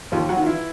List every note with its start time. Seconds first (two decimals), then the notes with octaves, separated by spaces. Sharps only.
0.12 D#2 F3 F4
0.29 F#3 F#4
0.37 D#3 F4
0.46 E3 E4